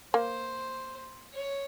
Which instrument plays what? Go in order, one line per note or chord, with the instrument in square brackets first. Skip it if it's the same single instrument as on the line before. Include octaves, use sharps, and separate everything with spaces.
[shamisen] A#3 [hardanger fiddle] C5
[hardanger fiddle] C#5